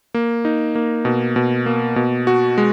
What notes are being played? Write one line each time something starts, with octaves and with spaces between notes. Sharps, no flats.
A#3
D#4
A#3
B2
B2
A#3
B2
F#4
G#3